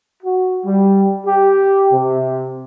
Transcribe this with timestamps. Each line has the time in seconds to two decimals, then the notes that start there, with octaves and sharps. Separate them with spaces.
0.22 F#4
0.65 G3
1.26 G4
1.93 C3